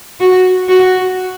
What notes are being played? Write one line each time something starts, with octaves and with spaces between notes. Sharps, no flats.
F#4
F#4